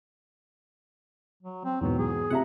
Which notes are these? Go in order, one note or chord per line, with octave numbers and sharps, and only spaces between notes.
F#3
C4
E2 G#2 B2 F#3
G#4
C3 E5 F#5 A#5